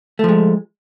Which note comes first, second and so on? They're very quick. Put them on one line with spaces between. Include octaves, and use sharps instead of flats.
A3 F3 G#3